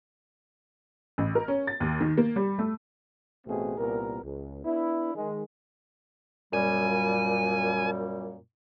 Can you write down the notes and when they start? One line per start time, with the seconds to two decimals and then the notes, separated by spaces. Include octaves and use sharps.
1.18 A1
1.35 A#4
1.48 C#4
1.67 A6
1.80 D#2
2.01 D#3
2.18 A#3
2.36 G3
2.59 A3
3.47 A1 B2 A3 C4 G#4
3.78 C2 A#2 B3 A#4
4.23 C#2
4.65 B3 D4 E4
5.15 D#3 G#3
6.53 F#2 A#2 G3 G#5